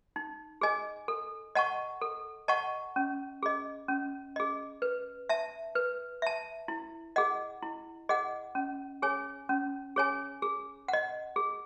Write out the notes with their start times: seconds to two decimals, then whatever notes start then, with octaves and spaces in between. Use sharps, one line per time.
0.16 D#4
0.61 G#4 D#5 G#5
1.08 A4
1.55 D#5 F#5 A5 C#6
2.02 A4
2.48 D#5 F#5 A5 C#6
2.96 C#4
3.43 G#4 D#5
3.88 C#4
4.36 G#4 D#5
4.82 B4
5.29 E5 A5
5.75 B4
6.22 E5 A5
6.68 E4
7.16 G#4 D#5 F#5
7.63 E4
8.09 G#4 D#5 F#5
8.55 C#4
9.02 G#4 C#5 G#5
9.49 C#4
9.96 G#4 C#5 G#5
10.42 G#4
10.88 D#5 F#5
11.36 G#4